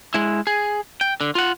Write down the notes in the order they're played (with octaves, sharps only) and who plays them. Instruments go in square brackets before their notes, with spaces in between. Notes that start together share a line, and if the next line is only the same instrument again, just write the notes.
[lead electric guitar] G#3 E4
G#4
G5
D3
F4 F#5